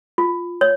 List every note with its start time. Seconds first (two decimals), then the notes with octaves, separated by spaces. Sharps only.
0.18 F4
0.61 C#5